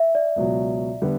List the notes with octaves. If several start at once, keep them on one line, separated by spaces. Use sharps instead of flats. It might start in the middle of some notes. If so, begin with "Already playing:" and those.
Already playing: E5
D5
C#2 B2 F#3
D3 G3 B3